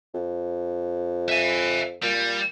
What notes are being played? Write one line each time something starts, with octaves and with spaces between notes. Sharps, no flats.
F2
E5 G#5
A#2 G3